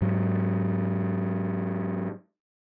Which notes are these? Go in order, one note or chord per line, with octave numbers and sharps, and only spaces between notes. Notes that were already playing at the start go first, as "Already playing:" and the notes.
G#2 F#3